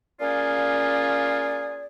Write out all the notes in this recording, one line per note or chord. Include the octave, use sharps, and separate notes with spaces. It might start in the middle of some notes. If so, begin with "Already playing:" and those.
A#3 C#4 F4 G#4 D5